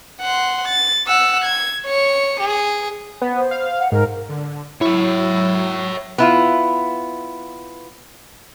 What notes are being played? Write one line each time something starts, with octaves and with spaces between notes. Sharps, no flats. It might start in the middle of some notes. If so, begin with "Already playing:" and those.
F#5 C6
A6
F#5 E6
G#6
C#5 C#7
G#4
B3
C5
F5
F#5
G#2 A#4
D3
F#3 E4 C#5 E5
B3 E4 F4